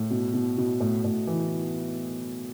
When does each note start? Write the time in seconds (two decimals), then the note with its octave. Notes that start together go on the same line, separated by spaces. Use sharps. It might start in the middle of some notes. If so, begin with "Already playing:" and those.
Already playing: A2
0.10 B2
0.33 B2
0.57 B2
0.80 A2
1.05 A2
1.27 E3